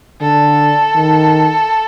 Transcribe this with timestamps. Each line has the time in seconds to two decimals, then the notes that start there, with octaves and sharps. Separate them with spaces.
0.21 D3 A4
0.95 D#3